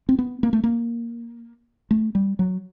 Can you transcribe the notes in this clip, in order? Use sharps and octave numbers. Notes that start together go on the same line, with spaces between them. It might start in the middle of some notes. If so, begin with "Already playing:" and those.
C4
B3
A#3
A3
A#3
A3
G3
F#3